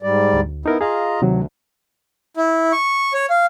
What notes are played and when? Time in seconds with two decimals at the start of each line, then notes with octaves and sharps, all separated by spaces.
0.03 G#2 G3 D5
0.34 D2
0.66 B3 D#4 E4 A#4
0.81 F4 G#4 D#5 F5 A#5
1.22 D2 C3 D#3 F#3
2.37 E4
2.72 C#6
3.13 C#5
3.30 F5